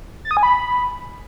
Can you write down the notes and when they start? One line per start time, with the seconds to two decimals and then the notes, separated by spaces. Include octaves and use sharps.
0.25 A6
0.31 D#6
0.37 G#5
0.43 B5